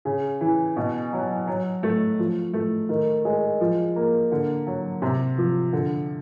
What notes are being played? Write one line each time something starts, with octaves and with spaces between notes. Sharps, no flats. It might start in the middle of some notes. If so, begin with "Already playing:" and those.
C#3
E3
B2
F#3
F#3
A3
F3
A3
D#3
G#3
F3
A#3
D3
F#3
C3
F3
D3